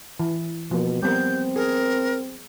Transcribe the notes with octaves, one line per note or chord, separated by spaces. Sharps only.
E3
B2 F3 A#3
G3 B3 C4 A#4 G6
G#4 A#4